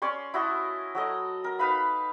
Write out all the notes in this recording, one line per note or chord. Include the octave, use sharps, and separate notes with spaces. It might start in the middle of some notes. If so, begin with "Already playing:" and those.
C#4 C#5 D5 C6
E4 F#4 D#5 A5
F#3 A4 D#5 D6
A#4
D#4 B4 F5 B5